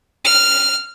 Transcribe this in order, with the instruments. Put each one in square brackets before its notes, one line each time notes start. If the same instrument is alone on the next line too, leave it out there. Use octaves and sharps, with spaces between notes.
[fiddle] F6